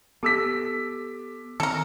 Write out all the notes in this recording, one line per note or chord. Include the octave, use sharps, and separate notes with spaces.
B3 G4 A4 A5 D6 E6 B6
D#3 C4 A4 A#4